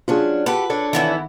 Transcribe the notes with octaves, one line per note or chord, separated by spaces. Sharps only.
F#3 C#4 D4 F4 G#4
F#4 G4 A4 B4
D4 A4 C#5
D#3 E3 B3 E4